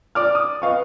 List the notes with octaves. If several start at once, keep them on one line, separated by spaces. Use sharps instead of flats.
D5 D6 F6
D#6
B4 D#5 F5 C#6